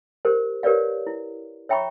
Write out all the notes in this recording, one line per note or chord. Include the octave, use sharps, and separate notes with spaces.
G4 A#4 C5
G4 A#4 B4 C#5 D5 F5
E4
C#5 E5 G5 A#5 B5 C#6